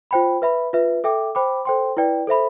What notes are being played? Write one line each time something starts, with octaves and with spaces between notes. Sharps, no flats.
F4 C5 G5 B5
B4 E5 B5
F4 B4 E5
A4 E5 G5 D6
C5 G5 B5 D6
A4 C5 G5 C6
E4 B4 D5 G5
A4 C5 E5 B5